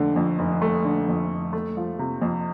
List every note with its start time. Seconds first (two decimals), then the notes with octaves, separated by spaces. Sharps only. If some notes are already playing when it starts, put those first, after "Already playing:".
Already playing: F1 D3 A3
0.16 F2
0.39 F1
0.62 A3
0.85 D3
1.08 F2
1.30 F1
1.53 A3
1.77 F3
1.99 C3
2.22 F2